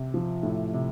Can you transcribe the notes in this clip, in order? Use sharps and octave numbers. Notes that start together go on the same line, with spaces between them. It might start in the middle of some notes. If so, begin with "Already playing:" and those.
Already playing: C3
F3
A2
C3